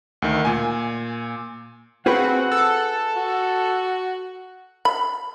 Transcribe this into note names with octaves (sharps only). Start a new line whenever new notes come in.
D2 D#3
A#2 G#5
C4 F4 F#4 G#4 B4 F#5
A4
F#4
B5